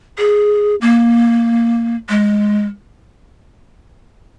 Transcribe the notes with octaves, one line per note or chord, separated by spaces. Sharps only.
G#4
A#3
G#3